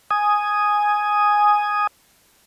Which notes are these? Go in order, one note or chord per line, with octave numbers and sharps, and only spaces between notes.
G#5 D#6